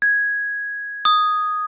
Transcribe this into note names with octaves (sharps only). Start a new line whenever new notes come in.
G#6
D#6